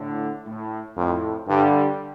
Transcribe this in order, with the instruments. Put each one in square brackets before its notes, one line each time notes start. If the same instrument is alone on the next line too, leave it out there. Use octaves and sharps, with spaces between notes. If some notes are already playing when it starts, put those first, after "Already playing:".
Already playing: [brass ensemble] A2 D3
A2
[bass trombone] F2 [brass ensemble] A2
[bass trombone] G2 [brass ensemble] D3 G3